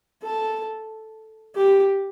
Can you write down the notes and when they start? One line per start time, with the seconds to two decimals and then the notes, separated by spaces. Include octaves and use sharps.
0.23 A4
1.55 G4